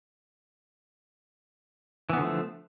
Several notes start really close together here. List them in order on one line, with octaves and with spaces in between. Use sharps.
E3 B3 D3 F3 A3